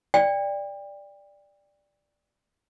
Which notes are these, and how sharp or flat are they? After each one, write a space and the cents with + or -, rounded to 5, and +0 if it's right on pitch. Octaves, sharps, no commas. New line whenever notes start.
D5 +0 G5 +30